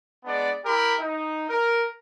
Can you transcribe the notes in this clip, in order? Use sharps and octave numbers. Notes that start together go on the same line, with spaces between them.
G#3 B3 D4 D5
E4 G4 A#4 B5
D#4
A#4